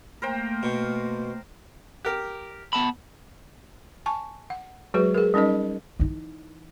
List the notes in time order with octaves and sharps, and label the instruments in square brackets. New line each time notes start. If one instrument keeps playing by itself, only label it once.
[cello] A3 A#3 [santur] A#4 C5 G5
[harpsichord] B2
[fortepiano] G4 A#4
[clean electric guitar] B3 A5 B5
[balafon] G#5 A5 C#6
F#5
F#3 G#3 F#4 G#4 B4
G#4 A#4
G3 C#4 D#4 A#4 D#5
[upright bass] E3 D#4